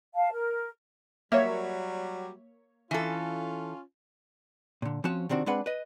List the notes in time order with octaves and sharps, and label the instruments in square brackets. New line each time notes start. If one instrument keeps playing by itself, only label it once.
[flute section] F5 A5
A#4
[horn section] F#3 G3 [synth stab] A#3 C#5 [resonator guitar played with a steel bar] E5
[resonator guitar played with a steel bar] E3 A4 [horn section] C#4 F4
[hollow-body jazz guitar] A#2 D3
F3 C4 C#4 F#4 A5
C3 D#3 C4 D4 F#4
G#3 C4 D4 G#4 B4 F#5
B4 D#5